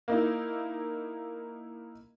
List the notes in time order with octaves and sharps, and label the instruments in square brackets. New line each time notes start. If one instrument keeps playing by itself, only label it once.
[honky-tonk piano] A#3 D#4 E4